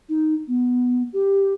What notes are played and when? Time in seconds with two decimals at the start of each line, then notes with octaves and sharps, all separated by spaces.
0.09 D#4
0.48 B3
1.13 G4